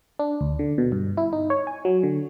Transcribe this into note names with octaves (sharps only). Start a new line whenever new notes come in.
D4
D2
D3
B2
G2
E4
D#4
C#5
G#5
F#3
D3